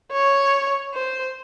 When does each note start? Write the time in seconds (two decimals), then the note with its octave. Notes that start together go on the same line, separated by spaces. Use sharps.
0.11 C#5
0.94 C5